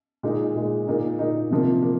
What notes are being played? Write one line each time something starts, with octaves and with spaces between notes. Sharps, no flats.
A#2 G#3 D#4
A#2 G#3 D#4
A#2 A#3 D#4
A#2 A#3 D#4
C3 F3 A#3
A#3